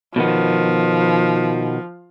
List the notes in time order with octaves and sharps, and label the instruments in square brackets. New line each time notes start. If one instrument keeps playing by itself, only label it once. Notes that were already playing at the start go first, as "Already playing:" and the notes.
[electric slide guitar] B2 D#3 B3 [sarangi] F3